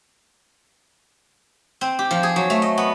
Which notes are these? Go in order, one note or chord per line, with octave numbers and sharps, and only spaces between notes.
C4
G4
F3
G#4
F#3
A3
D#5
B3